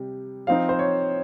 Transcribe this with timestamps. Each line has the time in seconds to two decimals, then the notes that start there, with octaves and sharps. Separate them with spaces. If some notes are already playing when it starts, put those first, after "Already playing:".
Already playing: C3 G3
0.47 F3 C4 D#4 F5
0.69 C5
0.79 C#5